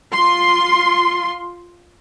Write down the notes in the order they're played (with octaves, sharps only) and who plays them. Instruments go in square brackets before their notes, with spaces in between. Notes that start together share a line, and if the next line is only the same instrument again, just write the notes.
[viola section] F4 C6